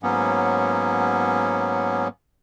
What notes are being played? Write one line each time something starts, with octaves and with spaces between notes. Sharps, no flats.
G#2 F#3 A#3 B3 C#4